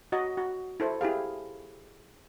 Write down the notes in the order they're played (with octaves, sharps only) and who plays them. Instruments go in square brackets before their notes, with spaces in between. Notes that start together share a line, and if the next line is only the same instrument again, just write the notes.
[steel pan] F#4 D#5
F#4
E4 A4 C5
E4 G4 G#4 F5